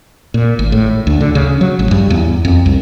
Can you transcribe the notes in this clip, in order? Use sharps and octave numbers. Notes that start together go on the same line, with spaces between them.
A#2
G#1
A2
D2
D3
C#3
F#3
A1
G2
E2
F2
C2